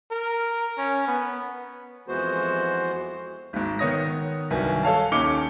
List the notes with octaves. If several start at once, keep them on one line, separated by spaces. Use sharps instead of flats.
A#4
C#4
B3
F2 E3 G#3 B3 F#4 C5
G#1 G#2
D#3 B3 C#5 D#6 A#6
C2 G2 D#3 F#3 B4 G#5
A4 C#5 F5 A5
D#2 C#4 D#4 D6 C#7 G7